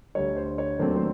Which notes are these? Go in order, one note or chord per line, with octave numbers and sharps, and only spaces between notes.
D2 D3 G3 C#5
C5
C#5
D#2 D3 F#3 A3 C4 C5
C5